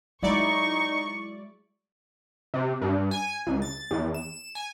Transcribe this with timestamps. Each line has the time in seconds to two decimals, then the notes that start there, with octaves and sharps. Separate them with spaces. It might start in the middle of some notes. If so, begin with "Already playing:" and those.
0.23 F#3 G#3 D#4 E4 D5 C#6
2.54 C3
2.82 G2
3.11 G#5
3.47 C#2
3.62 A6
3.91 E2
4.14 E7
4.55 G#5